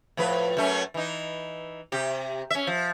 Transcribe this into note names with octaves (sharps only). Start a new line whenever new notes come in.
A2 F3 B4
F#2 A3 C#4
E3 D#4
C3 G4
C#4 E5
F3